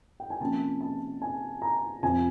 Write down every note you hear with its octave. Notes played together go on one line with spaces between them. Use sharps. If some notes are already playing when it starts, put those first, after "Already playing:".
G5
G#5
C3 F3 A#3 C#4 A5
A5
G#5
A#5
F2 C3 F3 G#5